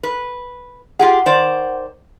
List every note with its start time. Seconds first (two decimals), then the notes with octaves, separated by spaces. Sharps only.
0.03 B4
0.99 F4 G4 G#4 F#5
1.26 D#3 C5 D5